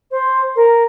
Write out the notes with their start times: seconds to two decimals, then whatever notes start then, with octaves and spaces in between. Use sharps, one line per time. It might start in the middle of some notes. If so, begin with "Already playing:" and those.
0.11 C5
0.56 A#4